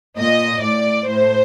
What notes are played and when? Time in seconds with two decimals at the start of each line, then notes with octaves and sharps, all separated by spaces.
0.17 A#2 D#5
0.62 A2 D5
1.08 A2 C5